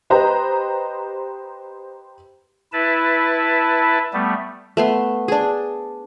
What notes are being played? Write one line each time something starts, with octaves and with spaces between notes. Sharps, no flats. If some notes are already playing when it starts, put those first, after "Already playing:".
G4 B4 C5 D#5 A#5
E4 B4 A5
G3 A3 B3
A3 B3 C6
D4 G#4